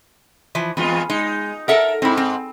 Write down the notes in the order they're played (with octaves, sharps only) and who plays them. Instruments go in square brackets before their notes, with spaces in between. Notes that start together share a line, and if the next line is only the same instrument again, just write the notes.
[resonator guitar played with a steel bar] E3 F3
[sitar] E2 G#3 F4 [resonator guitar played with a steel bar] B3
[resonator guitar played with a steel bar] G#3 [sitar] D#4
[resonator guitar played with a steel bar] A4 E5 F#5 [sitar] A#4
[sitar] G#2 [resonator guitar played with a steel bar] C4 E4
[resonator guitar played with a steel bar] C4